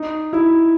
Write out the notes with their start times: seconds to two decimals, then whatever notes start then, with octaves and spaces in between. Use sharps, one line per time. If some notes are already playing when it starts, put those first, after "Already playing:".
Already playing: D#4
0.33 E4